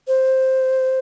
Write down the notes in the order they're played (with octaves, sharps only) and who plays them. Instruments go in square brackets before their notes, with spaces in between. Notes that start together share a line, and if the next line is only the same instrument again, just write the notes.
[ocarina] C5